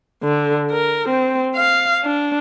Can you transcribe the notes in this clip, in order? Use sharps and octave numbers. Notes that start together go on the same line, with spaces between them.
D3
A#4
C4
F5
D4